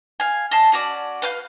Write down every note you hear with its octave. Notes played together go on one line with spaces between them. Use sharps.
F5 G#5
D#5 A5 C6
C#4 F#4 D5
B4 F5 G6